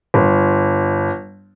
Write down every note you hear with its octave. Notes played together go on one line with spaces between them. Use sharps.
G1